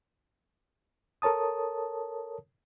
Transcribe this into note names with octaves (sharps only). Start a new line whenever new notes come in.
A4 A#4 C#5 A5 D#6